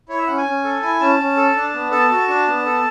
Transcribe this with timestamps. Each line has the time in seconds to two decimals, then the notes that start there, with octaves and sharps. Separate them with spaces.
0.09 E4 C#5
0.18 E5
0.27 C#4 F#5
0.37 G#5
0.46 C#4
0.64 A4
0.82 E4 G#5
1.00 C#4 A5
1.19 C#4
1.37 A4
1.56 D4
1.74 B3
1.92 A4 A5
2.11 F#4
2.28 D4
2.47 B3
2.66 A4